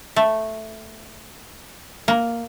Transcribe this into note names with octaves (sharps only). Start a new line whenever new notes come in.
A3
A#3